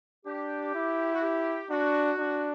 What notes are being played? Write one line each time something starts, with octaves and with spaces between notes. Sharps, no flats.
D4 G4
E4
F#4
G4
D4 F#4
D4